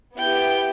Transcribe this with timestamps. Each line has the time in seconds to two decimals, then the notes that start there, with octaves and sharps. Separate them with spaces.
0.16 B3 E4 G4 G5